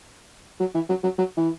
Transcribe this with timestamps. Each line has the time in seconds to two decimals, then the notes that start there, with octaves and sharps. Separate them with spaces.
0.60 F#3
0.75 E3
0.89 F#3
1.03 F#3
1.18 F#3
1.37 E3